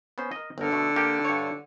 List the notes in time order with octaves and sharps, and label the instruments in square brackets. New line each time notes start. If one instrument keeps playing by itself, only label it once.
[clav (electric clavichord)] B3 C#4 C5
A#4 D#5
[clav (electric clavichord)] G1 A#4 [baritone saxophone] D3
[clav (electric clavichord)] B2 A3
A#3 G4 A4
G2 C#5